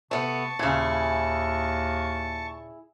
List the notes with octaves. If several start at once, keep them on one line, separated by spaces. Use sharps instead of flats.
C3 A3 B3 A5 C#6
D#2 A#2 C#3 E4 G#4